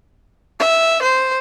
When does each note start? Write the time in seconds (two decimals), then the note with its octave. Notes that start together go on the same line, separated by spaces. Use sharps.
0.60 E5
1.02 C5